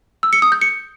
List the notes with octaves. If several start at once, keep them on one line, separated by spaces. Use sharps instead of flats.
E6
C#7
D#6
G6
C#7